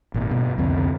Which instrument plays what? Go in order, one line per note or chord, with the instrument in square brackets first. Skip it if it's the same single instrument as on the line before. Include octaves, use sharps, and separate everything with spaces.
[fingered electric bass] G#1 A#2
G2 B2
C2 F2 D3 C4